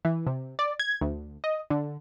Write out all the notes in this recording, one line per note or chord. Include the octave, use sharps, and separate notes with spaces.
E3
C3
D5
G#6
D2
D#5
D3